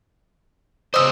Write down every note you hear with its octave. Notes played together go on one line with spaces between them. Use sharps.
C#3 E3 C5 D#5 E6